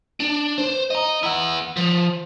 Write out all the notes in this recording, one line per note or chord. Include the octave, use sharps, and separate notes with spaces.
D4
C5
D#5 A#5
E4 F#5
F3